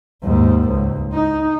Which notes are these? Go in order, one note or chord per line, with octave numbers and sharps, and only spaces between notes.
D#2 G#2
C#2
D#4